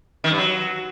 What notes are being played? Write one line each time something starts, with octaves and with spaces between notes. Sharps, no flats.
D#3
G2
F#3